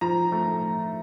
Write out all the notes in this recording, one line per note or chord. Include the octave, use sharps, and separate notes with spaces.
F3 A#5
A3